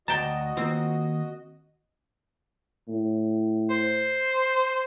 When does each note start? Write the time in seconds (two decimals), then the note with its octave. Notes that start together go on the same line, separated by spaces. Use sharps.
0.08 D2 F#4 D#5 G5 A5 A#5
0.57 D#3 A#3 C4 F4
2.88 A2
3.70 C5